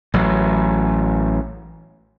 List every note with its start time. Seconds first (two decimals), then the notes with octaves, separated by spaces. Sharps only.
0.14 A1 F#3